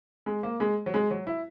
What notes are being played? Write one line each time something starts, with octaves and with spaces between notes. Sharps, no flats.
G#3
A#3
G#3
F#3
G#3
F#3
E4